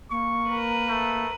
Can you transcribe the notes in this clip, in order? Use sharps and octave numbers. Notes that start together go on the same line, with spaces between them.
A#3 C#6
A#4 B4
A3